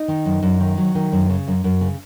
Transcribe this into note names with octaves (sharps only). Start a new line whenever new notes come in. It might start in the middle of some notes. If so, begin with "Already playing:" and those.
Already playing: D#4
D#3
F#2
F#2
D#3
F#3
D#3
F#2
C#3
F#2
F#2
C#3